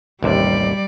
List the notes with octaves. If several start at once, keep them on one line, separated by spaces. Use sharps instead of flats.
A1 D#2 C3 G3 D5